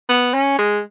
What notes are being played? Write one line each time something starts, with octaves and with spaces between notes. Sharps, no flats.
B3
C#4
G#3